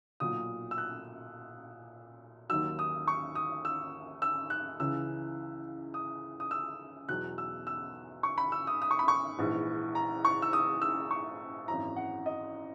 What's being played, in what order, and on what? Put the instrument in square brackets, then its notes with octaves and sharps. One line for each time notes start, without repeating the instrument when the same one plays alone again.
[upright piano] B1 A#2 F#3 D#6
E6
F#6
D#2 D#3 F#3 E6
D#6
C#6
D#6
E6
E6
F#6
C#2 C#3 E3 E6
D#6
D#6
E6
E2 B2 F#3 F#6
E6
E6
C#6
B5
E6
D#6
D#6
C#6
B5
C#6
A#1 G#2 E3
A#5
C#6
E6
D#6
E6
C#6
G#1 F#2 E3 A#5
F#5
D#5